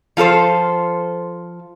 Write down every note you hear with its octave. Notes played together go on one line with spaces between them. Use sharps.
F3 F4 A4 C5